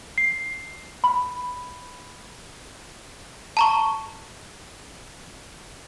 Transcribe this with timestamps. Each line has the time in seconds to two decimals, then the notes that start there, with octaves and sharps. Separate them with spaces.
0.18 C7
1.04 B5
3.57 A5 A#5 C#6